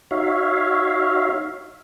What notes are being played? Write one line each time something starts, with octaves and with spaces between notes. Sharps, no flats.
D#4 F#4 C#5 E5 F5